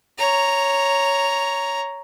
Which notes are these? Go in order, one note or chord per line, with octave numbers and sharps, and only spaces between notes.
C#5 A#5